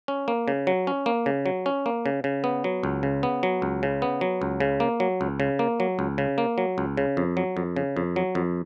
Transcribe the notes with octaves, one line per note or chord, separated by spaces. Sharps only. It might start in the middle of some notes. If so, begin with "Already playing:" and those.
C#4
A#3
C#3
F#3
C#4
A#3
C#3
F#3
C#4
A#3
C#3
C#3
B3
F#3
C#2
C#3
B3
F#3
C#2
C#3
B3
F#3
C#2
C#3
A#3
F#3
C#2
C#3
A#3
F#3
C#2
C#3
A#3
F#3
C#2
C#3
F2
F#3
F2
C#3
F2
F#3
F2